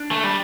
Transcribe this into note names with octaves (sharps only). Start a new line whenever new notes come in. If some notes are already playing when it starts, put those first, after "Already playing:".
Already playing: D4
A3
G3